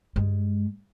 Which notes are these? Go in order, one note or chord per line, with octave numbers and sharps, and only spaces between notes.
G2 G#3